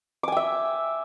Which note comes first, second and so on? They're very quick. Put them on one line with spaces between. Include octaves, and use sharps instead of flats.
D6 G#5 G5 E5